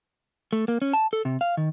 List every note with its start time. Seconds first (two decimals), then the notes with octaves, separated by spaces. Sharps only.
0.53 A3
0.68 A#3
0.82 C#4
0.93 A5
1.13 A4
1.25 C3
1.41 F5
1.57 D#3